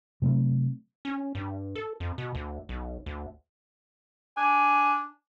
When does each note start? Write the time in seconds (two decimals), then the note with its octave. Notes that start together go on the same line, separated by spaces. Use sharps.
0.22 C3 F#3 A3 C4
1.05 C#4
1.35 G2
1.75 A4
2.00 F2
2.18 B2
2.35 D2
2.69 B1
3.06 D2
4.37 D4 G#5